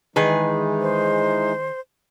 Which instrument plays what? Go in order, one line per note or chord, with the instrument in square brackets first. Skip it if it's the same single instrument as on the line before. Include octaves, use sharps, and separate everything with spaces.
[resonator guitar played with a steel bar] D#3 G#4 B4 [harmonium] E3 G#3 D#4
[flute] C5